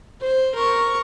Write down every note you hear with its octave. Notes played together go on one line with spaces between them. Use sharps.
C5
A#4 C#6